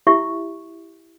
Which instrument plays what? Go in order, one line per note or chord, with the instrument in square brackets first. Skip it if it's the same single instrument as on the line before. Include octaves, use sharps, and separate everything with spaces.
[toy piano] E4 G4 E5 C#6